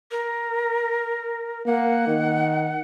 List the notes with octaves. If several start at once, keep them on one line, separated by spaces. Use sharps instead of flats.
A#4
A#3 F#5
D#3